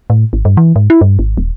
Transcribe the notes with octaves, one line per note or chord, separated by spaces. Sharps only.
A2
G#1
G2
E3
G#2
E4
G2
G#1
D#1